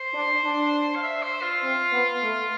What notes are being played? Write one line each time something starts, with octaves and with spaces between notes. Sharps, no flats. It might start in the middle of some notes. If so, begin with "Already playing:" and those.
Already playing: C5
D4
D4
F5
E5
C5
F4
C4
B3
A3